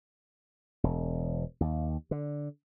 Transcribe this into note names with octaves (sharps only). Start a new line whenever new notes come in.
E1
D#2
D3